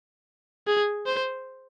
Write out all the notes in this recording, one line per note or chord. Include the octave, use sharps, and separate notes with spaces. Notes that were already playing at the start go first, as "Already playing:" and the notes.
G#4
C5